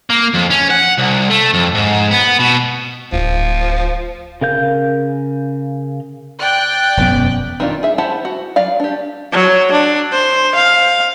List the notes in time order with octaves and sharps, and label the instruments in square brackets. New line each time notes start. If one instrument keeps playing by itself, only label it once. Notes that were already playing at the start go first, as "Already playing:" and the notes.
[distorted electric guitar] A#3
F2
C#4
F#5
C2
A3
F2
G#2
B3
B2
[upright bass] D1 D#4 [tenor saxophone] F3
[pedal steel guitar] C#3 A#4 F5 G6
[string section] D5 G5 F#6
[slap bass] E1 F#2 B3
[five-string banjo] D#3 C4 D4 F4
G#4 E5
E4 G4 C5 F#5 A5
F#4
F#3 D5 F5
D4 G4
[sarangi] F#3
D4
C5
F5